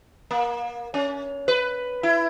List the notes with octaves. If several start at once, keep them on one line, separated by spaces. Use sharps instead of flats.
A#3
C#4
B4
E4